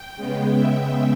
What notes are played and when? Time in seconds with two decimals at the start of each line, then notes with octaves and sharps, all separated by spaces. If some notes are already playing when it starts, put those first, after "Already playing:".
Already playing: G5
0.16 C#3 G#3 B3
0.54 E5